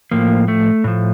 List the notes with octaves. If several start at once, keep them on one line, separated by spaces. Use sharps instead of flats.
A2 F3 A#3
A3
A2 F3